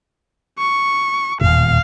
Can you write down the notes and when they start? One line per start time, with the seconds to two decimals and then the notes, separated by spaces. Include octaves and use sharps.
0.59 C#6
1.41 D#1 E2 B2 F5